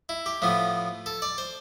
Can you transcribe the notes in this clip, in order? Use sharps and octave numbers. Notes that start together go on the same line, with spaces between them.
E4
G4
A2 F3 B3
A4
D5
C5